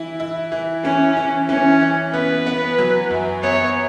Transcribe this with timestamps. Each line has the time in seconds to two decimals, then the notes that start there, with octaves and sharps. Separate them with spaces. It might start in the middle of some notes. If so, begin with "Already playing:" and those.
Already playing: E3 E4
0.20 E4
0.52 E3
0.84 E3 C#4
1.17 E3
1.49 E3 C#4
1.81 E3
2.13 B3 B4
2.46 B3
2.78 F#3
3.10 F#2
3.43 B3 C#5